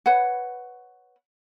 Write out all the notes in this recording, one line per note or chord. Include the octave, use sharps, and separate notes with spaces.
B4 C#5 F#5